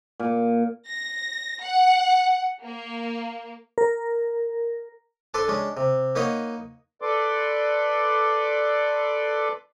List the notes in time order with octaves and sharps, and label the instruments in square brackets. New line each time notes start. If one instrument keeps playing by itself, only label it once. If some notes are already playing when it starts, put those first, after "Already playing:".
[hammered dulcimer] A#2
[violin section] A#6
F#5
A#3
[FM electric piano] A#4
[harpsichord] D4 A4 B4 D5 C6
G#3 C#4 D4
C3
A#3 D#4 B4 C#5 D#5 F#5
[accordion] A4 B4 D5 C6 D6